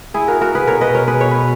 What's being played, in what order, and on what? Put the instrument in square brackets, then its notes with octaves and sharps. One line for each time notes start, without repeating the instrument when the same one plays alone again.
[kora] E4 G#4
F#4 A#4
F#4 A#4
G#4 B4
[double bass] B2 [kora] A#4 C#5
[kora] B4 D#5
A#4 C#5
G#4 B4
C#5
B4